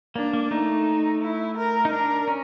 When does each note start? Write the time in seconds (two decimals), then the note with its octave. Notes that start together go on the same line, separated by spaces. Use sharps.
0.16 A#3 D4
0.33 A#3
0.51 A3 D#4
1.22 E4
1.58 A#4
1.85 D#4
1.93 D4 A#4
2.28 C#4